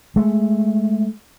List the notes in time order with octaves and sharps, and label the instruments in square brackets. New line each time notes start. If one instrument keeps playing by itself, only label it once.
[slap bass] G#3 A3